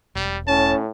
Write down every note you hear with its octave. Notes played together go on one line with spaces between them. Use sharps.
E1 G3
A2 C#4 A5